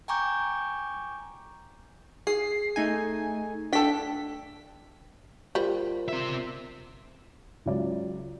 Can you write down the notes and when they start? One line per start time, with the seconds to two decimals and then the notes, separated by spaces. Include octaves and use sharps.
0.08 G5 G#5 A#5 C#6 D6 G6
2.27 G#4 C7
2.76 A3 D#4 G#5
3.73 D4 A4 G5 B6
5.55 G3 F4 A#4 C5
6.09 C4 E5
7.66 C#2 F#3 D5